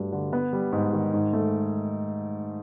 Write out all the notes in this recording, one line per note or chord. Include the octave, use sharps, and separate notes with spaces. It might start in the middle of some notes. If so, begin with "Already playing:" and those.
Already playing: G2 F#3 A3
D3
B3
G3
G#2
D#3
G#2
A3